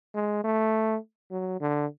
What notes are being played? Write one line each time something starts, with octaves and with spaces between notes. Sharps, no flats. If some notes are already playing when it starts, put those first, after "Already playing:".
G#3
A3
F#3
D3